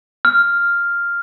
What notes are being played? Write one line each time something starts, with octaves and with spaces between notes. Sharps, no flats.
F6